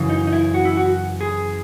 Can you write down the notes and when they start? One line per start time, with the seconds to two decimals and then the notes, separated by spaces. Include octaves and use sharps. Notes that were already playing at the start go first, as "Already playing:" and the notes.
Already playing: F#2 C#3 E3
0.09 D#4
0.27 D#4
0.33 E4
0.54 F#4
0.65 E4
0.77 F#4
1.21 G#4